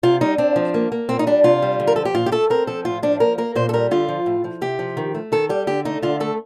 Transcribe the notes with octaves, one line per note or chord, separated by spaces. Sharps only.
C3 F4
G3 D#4
C4 D4
F3
A#3
A#3
A#2 C4
D#4
G3 D4
C3 F4
G3
D3
A#4
F3 A4
G4
A#2 F4
G4
A3 A4
C4 A#4
F3 A4
A2 F4
F3 D4
A#3 A#4
A#3 A#4
A#2 C5
A4
G3 A#4
D3 F4
F3
A2
F3
C3 G4
F3
D#3
A3
D#3 A4
G3 G4
D3 G4
A3 D#4
D3 F4
A3 A4